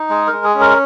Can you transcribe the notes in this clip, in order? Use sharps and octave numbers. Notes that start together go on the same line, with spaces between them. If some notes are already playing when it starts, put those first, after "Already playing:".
Already playing: D#4
G#3 G#4
G#3 A#4
G#4
C#4
A#4